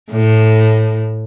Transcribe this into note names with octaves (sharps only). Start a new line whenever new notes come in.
A2